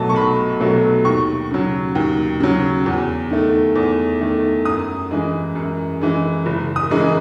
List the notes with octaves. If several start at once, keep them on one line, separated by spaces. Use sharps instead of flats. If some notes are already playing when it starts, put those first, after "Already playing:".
Already playing: B1 B2 F#3 A3 D#5 A5
C#6
B1 B5
B2 F#3 A3
D#2 C#6
C#3 F#3
D#2
C#3 F#3
E2
D#3 A3
E2
D#3 A3
F#2 D#6
E3 G#3
F#2
E3 G#3
F#1
D#6
F#2 E3 G#3